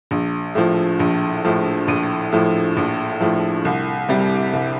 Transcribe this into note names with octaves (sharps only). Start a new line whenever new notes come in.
A#1
A2 F3
A#1
A2 F3
A#1 D#7
A2 F3
A#1
A2 F3
C2
C3 G3
C2